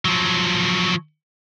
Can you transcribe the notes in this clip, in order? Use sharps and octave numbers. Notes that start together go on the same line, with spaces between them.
F3 F#3